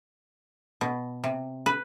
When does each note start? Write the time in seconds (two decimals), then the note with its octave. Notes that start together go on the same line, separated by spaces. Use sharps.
0.81 B2
1.24 C3
1.66 B4